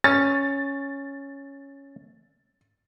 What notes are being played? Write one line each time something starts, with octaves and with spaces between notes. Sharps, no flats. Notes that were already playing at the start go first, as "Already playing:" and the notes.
C#4 A6